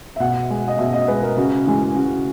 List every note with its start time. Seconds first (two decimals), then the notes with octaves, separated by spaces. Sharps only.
0.16 E5
0.20 B2 F#5
0.50 G#3
0.68 D#5
0.79 B2 E5
0.93 D#5
1.08 G#3 B4
1.23 A#4
1.37 C#3 F#4
1.67 E3 G#3
1.95 C#3 F#4